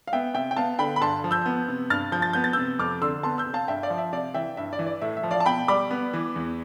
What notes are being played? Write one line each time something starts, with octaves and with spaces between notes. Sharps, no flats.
F5
B3 E5 G5
C3 E5 G5
G5
B3 F5 A5
D3 G5 B5
B5
G2 A5 C6
F3
E6 G6
B3
C3
G2 F6 A6
F3 G6
A6
B3 G6
A6
C3 E6 G6
F2 D6 F6
D3 C6 E6
B3 A5 C6
E6 G6
C3
F5 A5
G2 E5 G5
D5 F5
F3
E5
C3 D5 F5
E3 E5 G5
G2 E5
D5
E3
D5
A2 E5
E5
F3
D5 F5
A5
B2 G5 B5
G3 B5 D6
B3
E3
E2